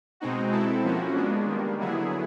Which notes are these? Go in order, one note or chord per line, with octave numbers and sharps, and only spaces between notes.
B2 G#3 C4 D#4 F#4
C4 E4 A4
F3 A#3 C#4 F#4
G#3 B3 D4
D#3 G3 A#3
D3 F#3 B3 E4 G#4